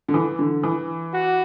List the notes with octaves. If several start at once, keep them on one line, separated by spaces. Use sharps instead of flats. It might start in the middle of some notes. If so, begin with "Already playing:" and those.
D3
E3
D3
E3
F#4